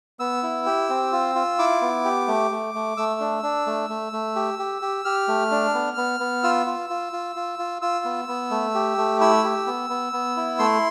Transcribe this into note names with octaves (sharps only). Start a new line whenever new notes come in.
B3 E6
E4
G4
C4
F4
F4
E4 D6
B3
G4
A3
A3
A3
A3 E6
D4
D4
A3
A3
A3
G4
G4
G4
G4 F6
A3
D4
B3
B3
B3
F4 E6
F4
F4
F4
F4
F4
F4 E6
B3
B3
A3
G4
A3
E4 E6
G4
B3
B3
B3
E4
A3 C6